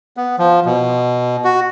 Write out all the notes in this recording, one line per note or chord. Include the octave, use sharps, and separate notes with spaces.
B3
F3
B2
F#4